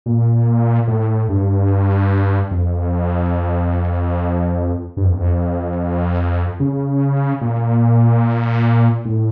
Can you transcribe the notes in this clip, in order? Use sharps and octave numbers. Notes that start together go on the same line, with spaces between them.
A#2
A2
G2
F2
G2
F2
E2
F2
C#3
A#2
A2